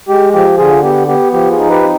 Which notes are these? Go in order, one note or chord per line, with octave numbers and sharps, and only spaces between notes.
G#3 G4
F3 G4
D3 F4 G#4
B3 G4
B3 G4
F3 G4
F4 G#4
D#4
G4 B4
C4